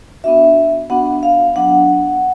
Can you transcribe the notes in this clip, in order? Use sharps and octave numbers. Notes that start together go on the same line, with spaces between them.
B3 D4 F#4 E5
B3 D4 F#4 F#5
F5
F#3 B3 D4 F#5